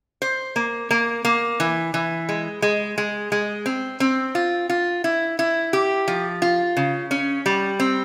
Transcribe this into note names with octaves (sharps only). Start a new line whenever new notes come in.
C5
A#3
A#3
A#3
E3
E3
G#3
G#3
G#3
G#3
C4
C4
F4
F4
E4
E4
G4
F3
F4
C#3
C#4
G3
C4